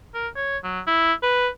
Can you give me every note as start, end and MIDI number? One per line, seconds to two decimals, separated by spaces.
0.14 0.28 70
0.36 0.58 73
0.64 0.80 54
0.87 1.13 64
1.23 1.48 71